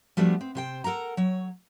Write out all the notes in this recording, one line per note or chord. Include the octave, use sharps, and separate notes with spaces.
F3 G3 A3 B3 D4 F#4
C4
C3 C5 G5
A4 A#4 F#5 A#5
F#3 C#5